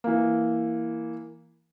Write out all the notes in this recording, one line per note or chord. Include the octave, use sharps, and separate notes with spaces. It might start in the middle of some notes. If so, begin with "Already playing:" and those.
E3 A#3